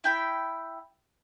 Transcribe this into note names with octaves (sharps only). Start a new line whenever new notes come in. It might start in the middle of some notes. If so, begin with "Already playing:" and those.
E4 G5 B5